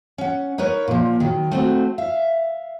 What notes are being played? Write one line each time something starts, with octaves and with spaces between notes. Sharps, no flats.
C#4 F#5
D#4 A#4 B4 C#5
A#2 F3
D#3 F#3
A3 C4 F#4
E5 F5